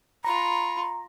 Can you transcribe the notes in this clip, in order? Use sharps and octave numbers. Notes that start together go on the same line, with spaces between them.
F4 A#5 B5 C#6